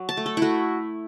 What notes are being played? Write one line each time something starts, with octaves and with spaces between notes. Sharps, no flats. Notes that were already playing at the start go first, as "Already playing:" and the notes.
Already playing: F#3
A5
A3
A4
A3 E4 F#4